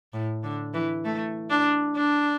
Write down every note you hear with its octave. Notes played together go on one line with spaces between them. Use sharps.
A2
D3
E3
A3
D4
D4